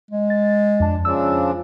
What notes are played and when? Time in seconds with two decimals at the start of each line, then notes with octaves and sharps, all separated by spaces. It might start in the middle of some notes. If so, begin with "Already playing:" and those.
0.10 G#3
0.30 A6
0.80 F2 D4 A5
1.05 C#3 F3 D4 E6